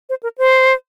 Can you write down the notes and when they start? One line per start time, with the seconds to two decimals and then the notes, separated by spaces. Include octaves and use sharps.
0.09 C5
0.23 A#4
0.38 C5